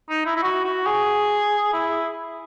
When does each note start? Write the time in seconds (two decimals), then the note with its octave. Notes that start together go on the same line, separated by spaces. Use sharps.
0.10 D#4
0.26 E4
0.37 E4
0.43 F#4
0.64 F#4
0.86 G#4
1.73 E4